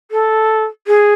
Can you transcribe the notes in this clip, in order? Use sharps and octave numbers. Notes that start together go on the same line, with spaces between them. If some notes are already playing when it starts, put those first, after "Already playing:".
A4
G#4